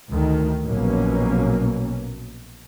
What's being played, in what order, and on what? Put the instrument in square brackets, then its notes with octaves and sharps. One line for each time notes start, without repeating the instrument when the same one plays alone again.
[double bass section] D2 D#3
A#1 B2 F#3 A#3 C#4